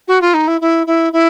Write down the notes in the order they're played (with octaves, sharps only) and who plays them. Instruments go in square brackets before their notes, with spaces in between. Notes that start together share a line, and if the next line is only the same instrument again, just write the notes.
[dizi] F#4
F4
D#4
E4
E4
E4
E4